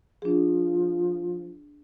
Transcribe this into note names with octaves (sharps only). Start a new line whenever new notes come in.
F3 D4 G#4